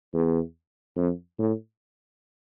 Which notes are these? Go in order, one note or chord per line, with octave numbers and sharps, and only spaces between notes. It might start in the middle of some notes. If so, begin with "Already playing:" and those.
E2
F2
A2